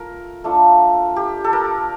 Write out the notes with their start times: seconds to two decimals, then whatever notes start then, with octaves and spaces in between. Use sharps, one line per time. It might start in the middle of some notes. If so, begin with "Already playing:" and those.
Already playing: A3 F4 A#4
0.44 A3 D4 F4
1.16 G4
1.44 A4
1.53 A#4